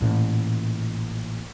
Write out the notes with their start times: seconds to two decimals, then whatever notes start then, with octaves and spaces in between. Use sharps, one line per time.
0.01 A1 A#2